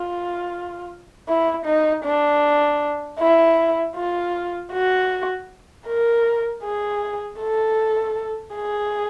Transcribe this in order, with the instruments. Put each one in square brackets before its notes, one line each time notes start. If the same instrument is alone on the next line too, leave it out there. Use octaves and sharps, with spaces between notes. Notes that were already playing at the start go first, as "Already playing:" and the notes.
Already playing: [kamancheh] F4
E4
D#4
D4
E4
F4
F#4
A#4
G#4
A4
G#4